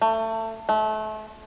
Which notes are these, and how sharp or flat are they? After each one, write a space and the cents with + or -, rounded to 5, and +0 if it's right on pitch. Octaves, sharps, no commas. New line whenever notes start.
A3 +25
A3 -30